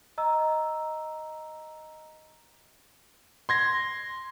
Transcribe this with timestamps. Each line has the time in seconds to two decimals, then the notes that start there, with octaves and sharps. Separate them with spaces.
0.18 D#5 A#5 E6
3.49 C6 G#6 A#6